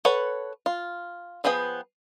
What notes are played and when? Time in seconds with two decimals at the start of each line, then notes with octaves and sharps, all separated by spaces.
0.05 A4 B4 C#5 F#5
0.66 F4
1.44 F3 B3 G#4 B4 G5